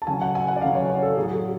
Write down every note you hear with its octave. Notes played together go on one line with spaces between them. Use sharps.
A5
C#3 F#3 G#5
F#5
G#5
F#5
D5
C#3 F#3 F5
C#5
C#5
A4
A2 F#3 G#4
F#4
G#4